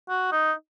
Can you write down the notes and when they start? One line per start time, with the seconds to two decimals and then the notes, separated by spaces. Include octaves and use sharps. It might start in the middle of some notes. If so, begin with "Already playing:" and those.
0.09 F#4
0.32 D#4